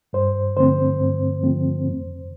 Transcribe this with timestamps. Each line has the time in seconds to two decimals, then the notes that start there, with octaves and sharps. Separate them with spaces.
0.13 G2 C5
0.57 D3 F3 A3 C4 C5
1.00 G2
1.43 D3 F3 A3 C4
1.86 F2